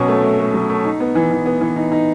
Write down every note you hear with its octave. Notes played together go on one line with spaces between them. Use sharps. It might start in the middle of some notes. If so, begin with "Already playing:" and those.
Already playing: B2 F#3 C#4
A3
A3
A3
F#3
A3
D#4
B3
E3
E3
B3
E3
D#4
D#4